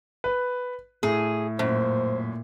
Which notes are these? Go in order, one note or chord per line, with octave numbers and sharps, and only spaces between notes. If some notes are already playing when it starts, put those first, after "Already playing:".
B4
A2 G#4
F#2 A#2 C5